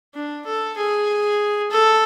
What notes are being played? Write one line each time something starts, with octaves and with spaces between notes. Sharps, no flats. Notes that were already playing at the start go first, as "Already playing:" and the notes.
D4
A4
G#4
A4